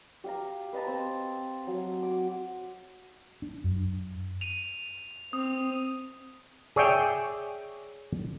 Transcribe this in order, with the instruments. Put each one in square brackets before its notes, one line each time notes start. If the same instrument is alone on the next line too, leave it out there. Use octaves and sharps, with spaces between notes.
[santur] G4 F5 A#5
B4 D#5 A5 A#5
C4 C5 A5
F#3 C6
D6
[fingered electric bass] D4
F#2
[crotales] D#7 F7
[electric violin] C4 [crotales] D#6
[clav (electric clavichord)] G#4 C#5 D5 E5 G5